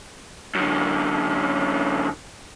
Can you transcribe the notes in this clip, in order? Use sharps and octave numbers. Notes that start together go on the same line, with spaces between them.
F#2 D3